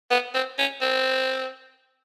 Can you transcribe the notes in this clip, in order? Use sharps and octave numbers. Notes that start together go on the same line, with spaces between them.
B3
C4
C#4
C4